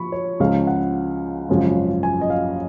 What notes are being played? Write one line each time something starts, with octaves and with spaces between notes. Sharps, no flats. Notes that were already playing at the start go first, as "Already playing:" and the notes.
Already playing: F3 B5 C#6
C#5
C#2 C#3 F3 F5
F#5
G#1 F#2 C#3 F3
G#5
D#5
F5